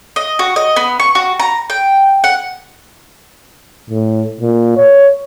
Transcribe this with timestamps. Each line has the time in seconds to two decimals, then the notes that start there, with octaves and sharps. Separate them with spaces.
0.16 D#5
0.39 F#4
0.56 D#5
0.76 B3
1.00 C#6
1.15 F#4
1.40 A#5
1.70 G5
2.24 F#5
3.90 A2
4.41 A#2
4.77 C#5